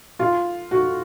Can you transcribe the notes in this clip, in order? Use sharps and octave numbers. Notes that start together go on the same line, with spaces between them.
F4
F#4